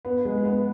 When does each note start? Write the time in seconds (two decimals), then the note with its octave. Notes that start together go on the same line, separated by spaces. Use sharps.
0.05 B3
0.25 G#3
0.45 B3